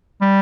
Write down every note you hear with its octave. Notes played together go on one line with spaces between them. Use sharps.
G3